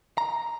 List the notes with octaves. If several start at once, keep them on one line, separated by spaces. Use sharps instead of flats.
A#5